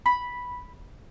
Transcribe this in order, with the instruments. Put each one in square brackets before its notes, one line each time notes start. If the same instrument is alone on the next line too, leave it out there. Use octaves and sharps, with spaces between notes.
[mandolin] B5